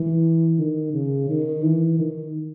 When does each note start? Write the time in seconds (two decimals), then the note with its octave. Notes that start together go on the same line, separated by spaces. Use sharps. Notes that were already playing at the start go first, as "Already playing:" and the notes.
Already playing: E3
0.59 D#3
0.94 C#3
1.29 D#3
1.64 E3
1.99 D#3